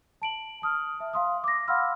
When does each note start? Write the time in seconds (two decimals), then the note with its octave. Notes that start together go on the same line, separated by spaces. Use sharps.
0.22 A5 D7 F#7
0.62 A5 D#6 F6
1.00 E5
1.13 F5 C6 D#6
1.44 D6 A#6
1.68 F5 F#5 B5 C6 E6 F6